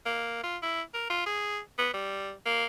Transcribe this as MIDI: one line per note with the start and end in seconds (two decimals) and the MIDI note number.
0.06 0.39 58
0.44 0.57 65
0.62 0.82 64
0.94 1.06 70
1.10 1.24 65
1.26 1.60 68
1.78 1.88 59
1.94 2.31 55
2.46 2.66 58